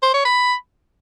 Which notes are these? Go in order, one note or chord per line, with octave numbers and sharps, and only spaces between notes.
C5
C#5
B5